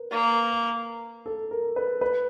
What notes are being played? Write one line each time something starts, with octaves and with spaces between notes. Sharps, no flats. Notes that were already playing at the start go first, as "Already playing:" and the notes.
Already playing: A#4 B4
A#3
A4
A#4
B4
B4